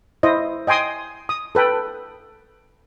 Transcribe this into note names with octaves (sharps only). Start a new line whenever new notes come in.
E4 C5 D#5
D#5 G5 G#5 C6 D#6
D#6
A4 B4 G5